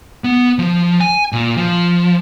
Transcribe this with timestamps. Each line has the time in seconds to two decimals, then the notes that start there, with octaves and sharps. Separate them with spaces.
0.24 B3
0.59 F3
1.00 G#5
1.33 A#2
1.57 F3